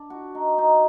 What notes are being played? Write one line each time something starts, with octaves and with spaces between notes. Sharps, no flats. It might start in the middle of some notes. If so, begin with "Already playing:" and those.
Already playing: D4
F#4
D#4
D#4